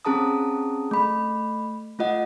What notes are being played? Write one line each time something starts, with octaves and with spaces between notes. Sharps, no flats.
C4 C#4 G#4 A5 A#5 D#6
A3 B5
A3 F4 D#5 F#5